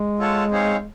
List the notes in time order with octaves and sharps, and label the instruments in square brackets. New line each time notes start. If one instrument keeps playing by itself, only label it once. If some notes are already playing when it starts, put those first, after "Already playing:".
Already playing: [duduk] G#3
[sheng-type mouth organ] F4 A4 C#5 F#5 A5
C4 D#4 G#4 C#5 F5